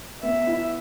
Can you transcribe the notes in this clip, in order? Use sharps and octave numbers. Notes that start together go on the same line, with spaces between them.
B3 E5
E4